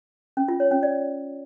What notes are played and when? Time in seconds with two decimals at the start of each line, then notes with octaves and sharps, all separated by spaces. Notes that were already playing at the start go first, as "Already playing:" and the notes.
0.37 C#4
0.48 F4
0.60 C#5
0.71 C#4
0.83 D5